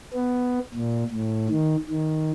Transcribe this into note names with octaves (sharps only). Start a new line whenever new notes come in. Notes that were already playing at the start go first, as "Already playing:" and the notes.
B3
A#2
A2
D#3
D#3